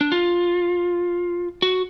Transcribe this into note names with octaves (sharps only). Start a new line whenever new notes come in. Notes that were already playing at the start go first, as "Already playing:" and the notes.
D4
F4
F#4